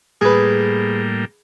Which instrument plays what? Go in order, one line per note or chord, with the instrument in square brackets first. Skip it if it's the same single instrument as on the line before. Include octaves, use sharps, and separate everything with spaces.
[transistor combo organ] A2 G3 A#3 [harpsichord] G#4 B4